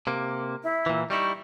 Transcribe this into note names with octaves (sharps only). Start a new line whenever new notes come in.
C3 A#3
E4
A#2 E3
G3 D#4 E4 C#6